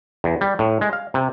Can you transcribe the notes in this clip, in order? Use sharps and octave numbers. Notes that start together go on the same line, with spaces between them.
E2
G3
A2
G#3
F5
C3